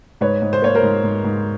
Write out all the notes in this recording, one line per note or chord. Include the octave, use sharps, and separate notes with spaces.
G#2 B4 C#5
G#2
C5
A#3 C#5
A#4 C5
G#2
G#2
G#2